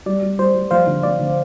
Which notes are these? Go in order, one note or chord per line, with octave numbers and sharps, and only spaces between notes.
G3 D5
G3
G3 C5
G3
F3 C5 F5
D3
D3 D5
D3